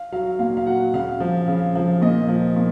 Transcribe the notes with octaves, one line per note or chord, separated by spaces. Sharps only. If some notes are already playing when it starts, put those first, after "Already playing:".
Already playing: F5
F#3 F5
A#2 F5
F5
F#3 F#5
C#3 F5
F3
C#3
F3
A#2 D#5
F3
A#2